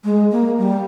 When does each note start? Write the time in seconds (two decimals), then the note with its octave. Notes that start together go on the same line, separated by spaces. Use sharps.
0.04 G#3
0.32 A#3
0.59 G3